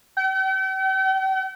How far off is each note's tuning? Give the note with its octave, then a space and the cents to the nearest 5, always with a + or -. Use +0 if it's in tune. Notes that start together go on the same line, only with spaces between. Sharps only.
G5 -45